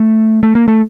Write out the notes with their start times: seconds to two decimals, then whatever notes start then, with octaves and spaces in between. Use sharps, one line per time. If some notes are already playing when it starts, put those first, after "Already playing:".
Already playing: A3
0.43 A3
0.55 A#3
0.68 A3